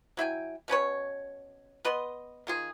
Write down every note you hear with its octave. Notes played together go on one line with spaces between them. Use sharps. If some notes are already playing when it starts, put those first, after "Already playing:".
F#3 E4 G5 G#5
B2 C#4 B4 C#5
B3 B4 D#5 C6
D#3 F4 G#4